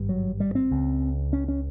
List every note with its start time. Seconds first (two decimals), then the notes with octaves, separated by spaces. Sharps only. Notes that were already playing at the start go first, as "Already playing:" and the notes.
Already playing: G#1 G2
0.09 F#3
0.40 G3
0.55 C4
0.71 C#2 C#3
1.33 C#4
1.48 C#4